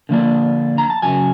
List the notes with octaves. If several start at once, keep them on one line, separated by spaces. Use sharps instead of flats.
D3 F3 A#3 D4
A#5
A5
F#2 C#3 F#3 G#5